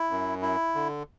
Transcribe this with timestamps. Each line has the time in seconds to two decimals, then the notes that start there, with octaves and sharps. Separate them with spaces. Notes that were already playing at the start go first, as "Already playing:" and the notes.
Already playing: E4
0.10 F#2
0.42 E4
0.75 D3